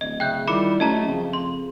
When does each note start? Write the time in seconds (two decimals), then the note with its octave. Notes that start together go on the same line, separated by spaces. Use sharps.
0.01 D1 D#5
0.20 C#3 E5 G5 F#6 G6
0.48 D#3 G3 E4 F4 B5 D6 C#7
0.80 F#2 A3 G#4 D#5 A5 A#5
1.07 F2 C#3
1.33 C6